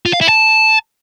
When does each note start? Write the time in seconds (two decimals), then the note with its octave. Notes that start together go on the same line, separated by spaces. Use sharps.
0.06 F4
0.13 F5
0.21 E4
0.29 A5